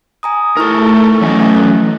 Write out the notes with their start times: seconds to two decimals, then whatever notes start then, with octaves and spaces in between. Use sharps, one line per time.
0.23 G#5 A#5 D#6
0.57 A3 D#4 E4 A4 A#4 C#6
1.21 E3 F#3 C#4 D#5
1.54 A3 F#6